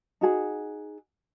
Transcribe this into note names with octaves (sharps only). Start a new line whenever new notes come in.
D#4 F#4 G#4